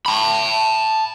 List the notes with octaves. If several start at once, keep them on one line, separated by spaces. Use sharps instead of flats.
A5 B5